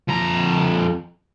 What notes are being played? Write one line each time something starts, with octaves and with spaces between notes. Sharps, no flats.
F2 A#5